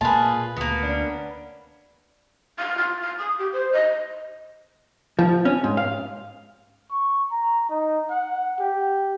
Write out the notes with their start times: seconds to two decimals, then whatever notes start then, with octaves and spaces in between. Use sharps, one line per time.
0.01 A#2 F4 G#4 B4 A5
0.56 D2 A#3 B3
0.83 C#4 D4
2.58 F5
2.78 F4
3.01 F5
3.18 D#6
3.38 G4
3.52 C5
3.72 D#5
5.19 F3
5.45 C#4
5.64 G#2
5.77 F5
6.90 C#6
7.31 A#5
7.69 D#4
8.10 F#5
8.60 G4